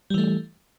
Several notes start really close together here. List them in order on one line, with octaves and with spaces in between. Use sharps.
G3 E3 A3